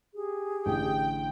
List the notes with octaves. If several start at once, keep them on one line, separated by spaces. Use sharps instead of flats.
G4 G#4
A1 D3 G5